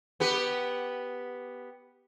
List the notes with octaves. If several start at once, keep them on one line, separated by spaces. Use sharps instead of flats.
B3 G4 B4